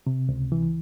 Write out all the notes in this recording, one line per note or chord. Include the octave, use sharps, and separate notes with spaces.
C3
C#2
E3